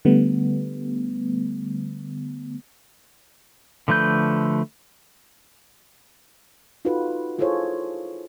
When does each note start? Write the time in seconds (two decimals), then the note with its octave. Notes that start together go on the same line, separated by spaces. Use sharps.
0.05 D3 G3 A3 B3
3.88 D3 F3 A3 B4 G6
6.85 D#4 F4 F#4 A4 B4
7.38 E4 F4 G#4 A4 C5 C#5